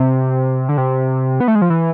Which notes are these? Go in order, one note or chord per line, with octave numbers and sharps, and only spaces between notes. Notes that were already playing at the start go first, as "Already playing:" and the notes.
Already playing: C3
D3
C3
B3
A3
G#3
F3
E3